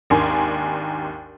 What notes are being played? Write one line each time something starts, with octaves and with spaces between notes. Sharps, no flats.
G#1 D#2 D4 A#4 G#5 C6